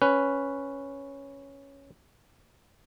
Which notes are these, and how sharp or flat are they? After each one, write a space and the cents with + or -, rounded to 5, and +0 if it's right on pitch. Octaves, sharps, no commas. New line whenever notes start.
C#4 +0 B4 +0